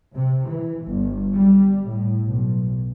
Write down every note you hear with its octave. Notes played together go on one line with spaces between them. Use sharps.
C3
E3
G1
G3
A2
B1